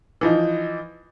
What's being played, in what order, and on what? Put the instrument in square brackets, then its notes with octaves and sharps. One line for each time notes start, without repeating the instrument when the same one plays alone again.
[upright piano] E3 F3 D#4